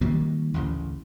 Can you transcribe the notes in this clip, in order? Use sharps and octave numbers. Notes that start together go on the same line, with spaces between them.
D#3 F#3 G3 A#3
A1 D2 C#3